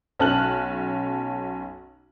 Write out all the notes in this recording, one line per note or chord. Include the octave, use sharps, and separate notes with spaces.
B1 C#4 A5 F6 F#6 F#7